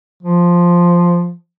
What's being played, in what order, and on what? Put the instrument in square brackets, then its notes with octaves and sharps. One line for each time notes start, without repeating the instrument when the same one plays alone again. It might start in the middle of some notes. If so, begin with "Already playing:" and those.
[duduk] F3